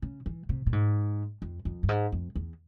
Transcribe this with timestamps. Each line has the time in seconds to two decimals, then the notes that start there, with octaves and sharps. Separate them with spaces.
0.02 C#3
0.26 E3
0.49 C3
0.66 A#2
0.73 G#2
1.42 F2
1.65 F2
1.83 G2
1.89 G#2
2.12 F2
2.35 E2